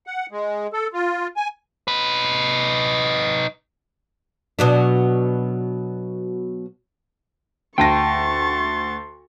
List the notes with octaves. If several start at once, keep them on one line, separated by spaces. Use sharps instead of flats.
F#5
G#3
A4
F4
G#5
D#4 B4
B2 F#3 D4
D2 G5 A5 C6 C#6 A6 A#6